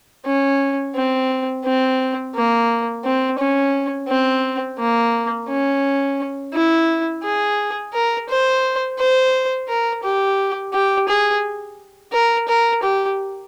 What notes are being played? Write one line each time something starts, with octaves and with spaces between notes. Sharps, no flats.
C#4
C4
C4
A#3
C4
C#4
C4
A#3
C#4
E4
G#4
A#4
C5
C5
A#4
G4
G4
G#4
A#4
A#4
G4